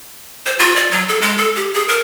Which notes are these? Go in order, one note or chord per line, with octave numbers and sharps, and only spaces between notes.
C5
F4
D5
F#3
A4
G#3
A4
G4
G#4
A#4